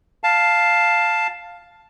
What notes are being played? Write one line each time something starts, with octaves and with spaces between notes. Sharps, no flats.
F5 A5